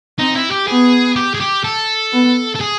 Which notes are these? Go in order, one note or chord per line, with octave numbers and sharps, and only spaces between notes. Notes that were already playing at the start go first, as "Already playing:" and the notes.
C4 D#4
E4
G4
B3 G#4
G4
G#4
G4
A4
B3
A4
G#4